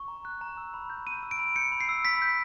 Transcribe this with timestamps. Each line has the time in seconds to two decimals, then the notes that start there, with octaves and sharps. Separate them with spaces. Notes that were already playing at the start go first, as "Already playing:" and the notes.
Already playing: C#6
0.08 A#5
0.25 F#6
0.41 A#5
0.57 E6
0.74 B5
0.90 G6
1.07 B5 D#7
1.23 E6
1.31 D7
1.39 B5
1.56 G6 C#7
1.72 B5
1.80 C7
1.89 E6
2.05 B5 B6
2.22 G6